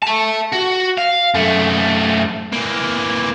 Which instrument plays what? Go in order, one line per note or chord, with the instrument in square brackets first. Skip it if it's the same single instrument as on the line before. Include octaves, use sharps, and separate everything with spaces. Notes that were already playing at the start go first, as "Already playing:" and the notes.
[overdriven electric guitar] E5 A5
F#4
F5
F#2 A3
[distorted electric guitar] E3 A#3